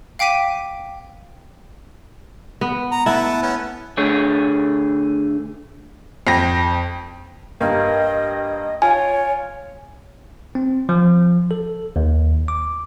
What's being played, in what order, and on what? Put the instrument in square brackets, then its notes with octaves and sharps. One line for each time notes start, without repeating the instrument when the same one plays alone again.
[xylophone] F5 G5 D6 B6 D#7
[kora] B3
[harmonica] A#5
[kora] A3 E4 [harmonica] B3 A5
[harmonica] B3 C#4
[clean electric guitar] D3 A3 G#4 C#5
[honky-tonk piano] F2 G5 A#6
[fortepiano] G2 A#3 [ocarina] D#5
[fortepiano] F4 [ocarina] C#5 [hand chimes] G#5
[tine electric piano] C4
F3
A4
D#2
D6